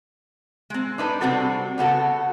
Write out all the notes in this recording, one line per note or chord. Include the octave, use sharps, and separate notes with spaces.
G#3 C4
D4 D#4 B4
C3 G3 C4 D4 F#4 A4
C#3 B3 F#4 A4